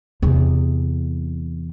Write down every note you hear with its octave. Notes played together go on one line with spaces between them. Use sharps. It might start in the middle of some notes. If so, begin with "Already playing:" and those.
E2 C3